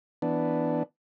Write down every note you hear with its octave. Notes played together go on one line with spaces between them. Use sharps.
E3 B3 D4